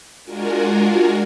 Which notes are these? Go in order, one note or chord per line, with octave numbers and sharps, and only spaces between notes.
G#3 D4 F4 F#4 G#4 A#4